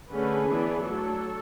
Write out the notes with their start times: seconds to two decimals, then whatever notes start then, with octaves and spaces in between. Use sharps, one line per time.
0.12 D3 A3 C#4 G#4 B4
0.49 E3 B3 D4
0.84 F#3 A3 D4 A4 C#5